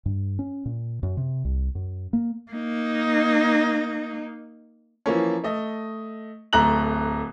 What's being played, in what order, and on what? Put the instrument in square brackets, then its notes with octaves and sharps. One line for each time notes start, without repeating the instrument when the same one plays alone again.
[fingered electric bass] G2
C#4
A#2
F#2
C3
C2
F#2
A#3
[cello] A#3 D#4
[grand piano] E3 F3 A#3 C#4
A3 D#5
D1 A3 A#5 F#6 F#7